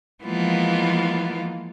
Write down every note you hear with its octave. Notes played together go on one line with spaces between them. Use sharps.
E3 F3 G#3 A#3 B3 F4